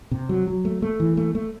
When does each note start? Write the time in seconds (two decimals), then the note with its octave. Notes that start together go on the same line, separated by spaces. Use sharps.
0.11 C3
0.29 F#3
0.47 F#3
0.65 A3
0.82 A3
1.00 E3
1.17 A3
1.35 A3